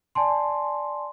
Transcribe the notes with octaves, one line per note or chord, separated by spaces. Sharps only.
D5 G#5 A5 C6